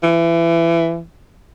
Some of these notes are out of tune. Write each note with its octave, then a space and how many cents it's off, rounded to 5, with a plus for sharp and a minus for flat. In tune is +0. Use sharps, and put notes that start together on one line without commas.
E3 +25